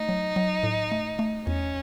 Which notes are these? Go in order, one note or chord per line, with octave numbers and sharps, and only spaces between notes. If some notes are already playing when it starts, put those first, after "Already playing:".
Already playing: A3 D#4
F#3
F#3
A2
A3
A3
E2 C#4